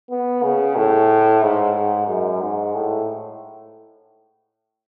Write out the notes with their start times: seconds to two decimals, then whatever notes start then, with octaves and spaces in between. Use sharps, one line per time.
0.10 B3
0.43 C#3
0.76 A2
1.42 G#2
2.07 F#2
2.41 G#2
2.75 A2